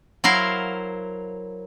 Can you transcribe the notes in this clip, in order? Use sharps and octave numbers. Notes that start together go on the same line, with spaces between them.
F#3 E4 A#4 C5 F5